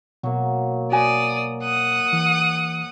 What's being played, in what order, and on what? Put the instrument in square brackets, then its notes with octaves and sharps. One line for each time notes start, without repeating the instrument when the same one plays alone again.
[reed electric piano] B2 [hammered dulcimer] F#3 A#3
[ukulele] F#4 G#5 [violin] D5 D#6
[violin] F#5 D#6
[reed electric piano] E3